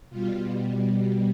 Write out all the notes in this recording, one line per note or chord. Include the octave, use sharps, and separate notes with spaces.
B2 G3 F4